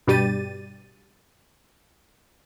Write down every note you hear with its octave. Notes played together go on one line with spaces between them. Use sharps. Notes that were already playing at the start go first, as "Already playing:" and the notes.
G2 B2 G3 G4 A6 D#7